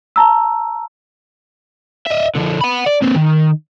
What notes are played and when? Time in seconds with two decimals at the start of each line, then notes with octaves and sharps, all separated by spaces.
0.16 A5 A#5 E6
2.06 D#5 E5
2.35 D3 F3
2.61 F#5 B5
2.86 D5
3.02 A#3 C4
3.16 D#3